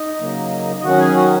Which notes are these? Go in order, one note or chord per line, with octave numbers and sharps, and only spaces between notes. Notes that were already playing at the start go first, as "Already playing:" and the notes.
Already playing: D#4 D#5
C#3 F#3 A#3
D#5
D#3 F#3 C#4 F#4 F#5
G#4 G#5
F#4 F#5